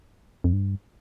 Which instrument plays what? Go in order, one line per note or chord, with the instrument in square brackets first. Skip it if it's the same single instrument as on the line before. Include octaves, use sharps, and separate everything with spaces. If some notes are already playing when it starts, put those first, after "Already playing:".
[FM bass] F2
G2